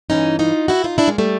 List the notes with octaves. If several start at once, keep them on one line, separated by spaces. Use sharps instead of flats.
G2 E3 C#4 D#4
D#4 F4
E4 F#4
D#4 F4
D4 E4
G#3 A#3
G3 A3